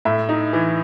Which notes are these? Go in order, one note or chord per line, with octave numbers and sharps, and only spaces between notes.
A2 E5
D#4
E3